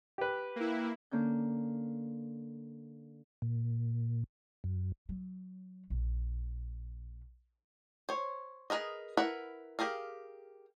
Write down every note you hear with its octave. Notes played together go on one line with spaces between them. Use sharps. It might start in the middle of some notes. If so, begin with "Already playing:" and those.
G4 B4
A#3 E4
D3 A#3 C#4 G6
A#2
F#2
F#3
A#1
C5 C#5
G#4 A#4 B4 D#5
E4 A#4 B4 F#5
G4 G#4 A#4 F5